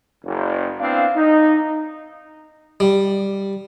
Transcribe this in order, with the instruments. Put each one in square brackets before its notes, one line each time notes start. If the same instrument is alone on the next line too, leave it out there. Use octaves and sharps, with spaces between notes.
[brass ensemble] F#1
B3 C4 D4 E4 F5
D#4
[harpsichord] G3